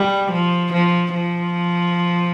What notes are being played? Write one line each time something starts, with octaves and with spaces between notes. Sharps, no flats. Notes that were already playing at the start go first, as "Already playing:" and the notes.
Already playing: G3
F3
F3
F3